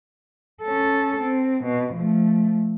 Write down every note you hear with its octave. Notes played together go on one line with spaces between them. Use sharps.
C#4 A4
C4
B2
F3 A3